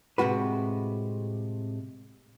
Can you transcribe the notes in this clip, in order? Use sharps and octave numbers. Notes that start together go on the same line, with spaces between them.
A2 C3 G#3 F#4 B4